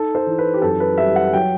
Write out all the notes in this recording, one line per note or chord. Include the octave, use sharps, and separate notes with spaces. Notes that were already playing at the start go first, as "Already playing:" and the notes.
Already playing: D#4 A4
C5
E3
B4
G4
F#2 A4
B4
G3 E5
F#5
F#3 G5